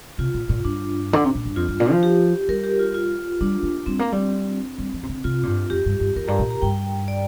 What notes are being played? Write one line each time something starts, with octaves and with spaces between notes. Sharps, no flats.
C3 F4
A#2
A#2
G2 D4
D3
C3
A#2
G2
F2 F4
G2
A#2
F3
G4
G3 A#4
G4
F4
F4
G3 D4
A#3
G3 C4
A#3
G3
G3
F3
C3
D3
C3 F4
A#2
G2
F2 G4
G2
G2
F2 A#4
G2 A#5
A#2
A#5
G2 G5
D5